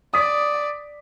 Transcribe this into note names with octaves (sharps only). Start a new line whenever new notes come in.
D5 D#6 B6